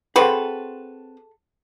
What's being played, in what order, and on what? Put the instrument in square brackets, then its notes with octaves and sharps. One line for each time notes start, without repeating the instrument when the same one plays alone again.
[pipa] C4 F#4 B4 [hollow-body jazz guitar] G#4 A4 F#5